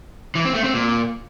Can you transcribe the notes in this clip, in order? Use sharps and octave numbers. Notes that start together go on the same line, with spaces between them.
E3
C4
A3
C4
A#2